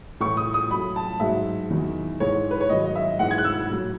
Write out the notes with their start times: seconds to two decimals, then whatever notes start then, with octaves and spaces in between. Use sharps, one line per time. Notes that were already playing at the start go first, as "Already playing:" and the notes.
0.20 A2 E3 C#6
0.37 D#6
0.54 D#6
0.70 A2 F#3 B5
0.96 A5
1.20 G#2 F#3 E5
1.70 E2 D#3 F#3
2.20 G#2 E3 C#5
2.51 B4
2.61 C#5
2.69 G#2 D#3 F#3 D#5
2.85 D#5
2.95 E5
3.19 G#2 E3 F#5
3.31 G#6
3.38 F#6
3.44 E6
3.70 A2 F#3